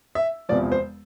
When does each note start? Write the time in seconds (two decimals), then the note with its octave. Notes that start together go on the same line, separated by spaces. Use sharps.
0.15 E5
0.49 E1 E2 C3 F3 D5
0.72 C5